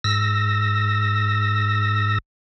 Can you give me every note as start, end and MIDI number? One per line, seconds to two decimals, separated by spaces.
0.04 2.18 44
0.04 2.18 88
0.04 2.18 94